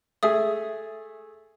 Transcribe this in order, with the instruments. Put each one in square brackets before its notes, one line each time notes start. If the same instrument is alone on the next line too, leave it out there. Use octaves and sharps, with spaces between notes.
[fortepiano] A3 G#4 [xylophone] E5 D#6